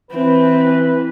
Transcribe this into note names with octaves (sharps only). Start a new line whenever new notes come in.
E3 C4 B4